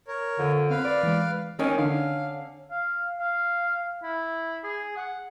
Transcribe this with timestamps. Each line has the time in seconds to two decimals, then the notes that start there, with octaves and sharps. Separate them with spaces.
0.08 A#4 C#5
0.39 F2 D3
0.70 C4 A#4 B4 F5
0.84 D5
1.03 E3 G#3
1.59 D#3 C#4
1.78 D3 F5
2.71 F5
3.20 F5
4.03 E4
4.64 G#4
4.97 F#5